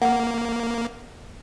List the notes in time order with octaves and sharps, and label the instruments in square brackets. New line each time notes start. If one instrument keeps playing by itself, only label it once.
[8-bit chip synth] A#3 [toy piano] F#5